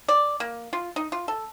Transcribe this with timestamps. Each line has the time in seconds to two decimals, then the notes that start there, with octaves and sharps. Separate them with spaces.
0.08 D5
0.40 A#3
0.73 F4
0.96 D#4
1.12 F4
1.28 A4